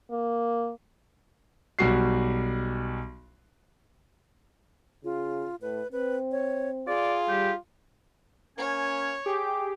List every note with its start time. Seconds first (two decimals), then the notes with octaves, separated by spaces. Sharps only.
0.11 A#3
1.79 B1 G3 F#4 C7
5.04 C#3 F4
5.62 A2 B4
5.92 C4 B4
6.32 C#5
6.88 F4 G#4 D5
7.29 G3 G4
8.58 A#3 C#4 C#5 G#5
9.26 G4 G#4 D6